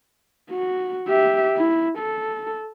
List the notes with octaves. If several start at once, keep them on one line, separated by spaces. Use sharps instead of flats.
F#4
G4 E5
E4
A4